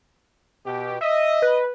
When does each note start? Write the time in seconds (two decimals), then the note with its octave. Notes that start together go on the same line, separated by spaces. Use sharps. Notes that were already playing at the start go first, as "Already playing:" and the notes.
0.66 B2 G4
1.01 D#5 E5
1.42 B4